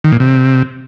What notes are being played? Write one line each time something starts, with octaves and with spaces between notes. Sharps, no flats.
D#3
A#2
C3